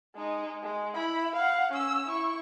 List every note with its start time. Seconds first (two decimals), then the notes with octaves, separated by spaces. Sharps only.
0.15 G#3 D#4
0.63 G#3
0.95 E4 B5
1.36 F5 F#5
1.72 C#4 E6
2.08 E4 C#6